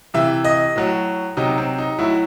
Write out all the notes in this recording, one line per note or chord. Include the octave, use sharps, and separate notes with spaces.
C3 E3 E5
D#5
A2 F#3
C3 F#3 D#4
C4
D#4
A2 F#3 E4